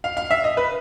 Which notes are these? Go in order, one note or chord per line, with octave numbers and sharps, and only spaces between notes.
F5
F5
E5
D#5
B4